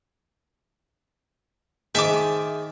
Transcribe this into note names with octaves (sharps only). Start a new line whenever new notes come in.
D#3 G#4 C5 E5 G5 A5 D6